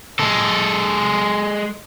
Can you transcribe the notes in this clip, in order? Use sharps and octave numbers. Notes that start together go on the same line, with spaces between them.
G#3 A4